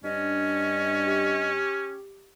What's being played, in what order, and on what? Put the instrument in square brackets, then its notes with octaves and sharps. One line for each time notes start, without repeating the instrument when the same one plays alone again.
[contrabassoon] G2 [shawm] C#4 [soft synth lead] D4 [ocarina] D#5
[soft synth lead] G4